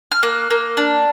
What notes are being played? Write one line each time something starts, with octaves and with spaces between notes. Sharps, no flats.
F6
A#3 F#6
A#3
D4